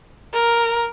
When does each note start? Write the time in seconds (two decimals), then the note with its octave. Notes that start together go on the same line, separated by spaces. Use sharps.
0.33 A#4